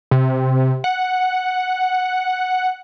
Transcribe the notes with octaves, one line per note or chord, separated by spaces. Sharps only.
C3
F#5